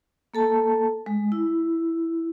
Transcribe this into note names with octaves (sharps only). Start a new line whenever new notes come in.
A#3 A4 A5
G#3
E4